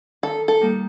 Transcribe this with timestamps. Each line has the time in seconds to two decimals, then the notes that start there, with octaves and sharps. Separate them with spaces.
0.23 D#3 A4
0.48 A4
0.61 G3 A#3 D#4 G4